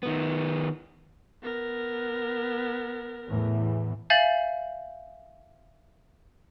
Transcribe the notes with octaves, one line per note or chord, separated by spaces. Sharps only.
D#3 B3
B3 A#4
E2 A2 E3
E5 F5 G#5 G6 A6 F#7